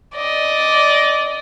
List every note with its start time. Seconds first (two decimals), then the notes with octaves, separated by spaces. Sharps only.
0.16 D5 D#5